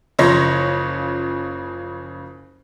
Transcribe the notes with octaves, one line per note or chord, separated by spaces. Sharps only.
F#1 C#3 F3 C#5 C6 A#6